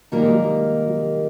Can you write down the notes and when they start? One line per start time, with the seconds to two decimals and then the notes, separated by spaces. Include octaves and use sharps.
0.12 D#3 G3 A#3 D#4 A#4
0.21 G#3
0.30 G3
0.86 G3